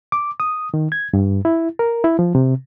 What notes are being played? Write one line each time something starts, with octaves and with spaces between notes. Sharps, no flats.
D6
D#6
D#3
G#6
G2
E4
A#4
E4
F3
C3